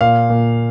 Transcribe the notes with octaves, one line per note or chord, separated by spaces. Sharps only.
A#2 F5
A#2